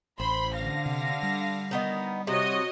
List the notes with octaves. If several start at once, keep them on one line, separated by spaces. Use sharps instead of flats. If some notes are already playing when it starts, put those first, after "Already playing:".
A1 C5 B5 C6
D3 F5 A#6
C3
G3
D#3 B3 D#4
C3 F#4 C#5 D#5